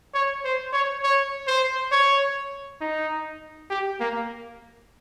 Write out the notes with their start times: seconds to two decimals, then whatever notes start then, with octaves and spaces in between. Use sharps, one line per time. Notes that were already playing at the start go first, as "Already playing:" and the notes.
0.14 C#5
0.44 C5
0.73 C#5
1.03 C#5
1.48 C5
1.92 C#5
2.81 D#4
3.70 G4
4.00 A#3